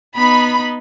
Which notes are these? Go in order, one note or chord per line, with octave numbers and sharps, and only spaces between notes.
B3 D#4 B5